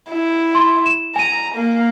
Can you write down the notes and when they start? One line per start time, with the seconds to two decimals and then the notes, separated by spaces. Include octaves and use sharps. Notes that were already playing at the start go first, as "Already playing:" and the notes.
0.10 E4
0.55 C6
0.86 E7
1.16 G#5 A#5 D#7
1.55 A#3